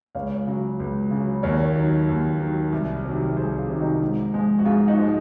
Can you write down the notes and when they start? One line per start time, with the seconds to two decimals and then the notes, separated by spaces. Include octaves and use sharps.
0.15 C#2 C#5 F5
0.47 C#3 F#3
0.80 C#2
1.11 C#3 F#3
1.43 D#2 A#4 C#5
1.76 D#3 F#3
2.09 D#2
2.40 D#3 F#3
2.72 C2
3.05 C3 D#3 F#3
3.37 C2 G#4 C5
3.58 F4 G#4
3.69 C3 D#3 F#3
3.80 D#4 F#4
4.02 G#2
4.34 F3 G#3
4.59 F#4
4.66 G#2 F4 G#4
4.87 D#4 F#4
4.98 F3 G#3